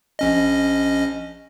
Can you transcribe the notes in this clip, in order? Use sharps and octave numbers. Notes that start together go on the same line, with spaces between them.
A#1 C#4 D#5